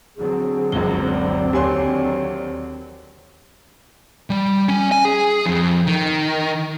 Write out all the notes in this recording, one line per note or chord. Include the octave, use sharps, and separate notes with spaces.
D3 F#3 C4 G#4
F#1 C#2 F#2 G7
D5
D#2 G4 C#5 G#5 C6
G3
C#4
G#5
G#4
F2
D#3